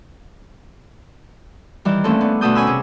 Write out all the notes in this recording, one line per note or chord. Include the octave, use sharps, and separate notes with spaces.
D#3 E3 G3
D#2 A3 C4 C#4 A4
B3 D4
D2 B2 A3 A4 D#6 G6
C#4 G#5 B5 E6
C3 G#4